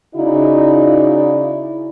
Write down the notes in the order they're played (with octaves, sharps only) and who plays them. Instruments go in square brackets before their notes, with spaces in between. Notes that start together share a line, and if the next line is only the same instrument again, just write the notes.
[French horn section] C#3 D#4 E4 F#4 D5